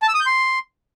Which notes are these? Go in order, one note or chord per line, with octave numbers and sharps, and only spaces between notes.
A5
E6
D#6
G6
C6